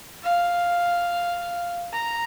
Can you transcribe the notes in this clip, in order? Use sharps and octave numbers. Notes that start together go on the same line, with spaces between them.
F5
A#5